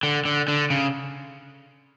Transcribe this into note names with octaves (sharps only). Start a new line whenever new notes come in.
D3
D3
D3
C#3